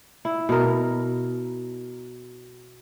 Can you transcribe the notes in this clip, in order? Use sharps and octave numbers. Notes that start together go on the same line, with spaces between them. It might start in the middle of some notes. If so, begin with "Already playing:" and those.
E4
B2 A#4